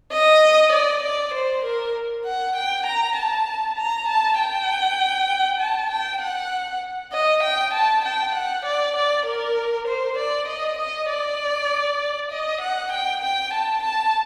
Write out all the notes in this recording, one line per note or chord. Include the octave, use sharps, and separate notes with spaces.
D#5
D5
D5
C5
A#4
F#5
G5
A#5
A5
A#5
A5
G5
A5
G5
F#5
D#5
G5
A5
G5
F#5
D5
D5
A#4
C5
D5
D#5
D#5
D5
D#5
F#5
G5
G5
A5
A5